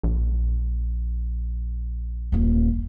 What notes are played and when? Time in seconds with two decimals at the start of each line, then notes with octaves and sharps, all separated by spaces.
0.03 A#1
2.32 D#1 A#3